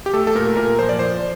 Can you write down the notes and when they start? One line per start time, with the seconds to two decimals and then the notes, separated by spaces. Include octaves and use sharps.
0.06 G4
0.14 A3 A4
0.27 A4
0.35 A#2 A#4
0.57 A#2 A#4
0.79 F3 C5
0.89 D5
0.99 F3 C5